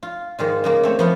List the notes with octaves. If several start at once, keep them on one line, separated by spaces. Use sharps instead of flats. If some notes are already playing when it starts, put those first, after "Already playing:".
F4
G#2 D#3 G#3 F4
C#3 G#3 A#3
A3 C4 C#5
F3 B3 F4